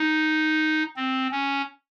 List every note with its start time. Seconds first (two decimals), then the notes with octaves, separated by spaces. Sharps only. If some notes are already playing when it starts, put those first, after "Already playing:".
Already playing: D#4
0.97 C4
1.31 C#4